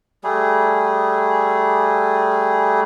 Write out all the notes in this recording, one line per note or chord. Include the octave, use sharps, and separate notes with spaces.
G3 A3 G#4